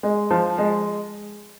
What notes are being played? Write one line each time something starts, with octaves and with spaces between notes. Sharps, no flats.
G#3
F3
G#3